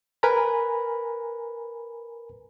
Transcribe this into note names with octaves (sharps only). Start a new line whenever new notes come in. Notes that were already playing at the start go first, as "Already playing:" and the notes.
A#4 B4 G#5 A#5 B5